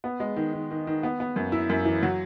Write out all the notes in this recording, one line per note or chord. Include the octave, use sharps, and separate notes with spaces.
B3
G#3
D#3
D#3
D#3
D#3
B3
B3
F#2
E4
F#2
E3
F#3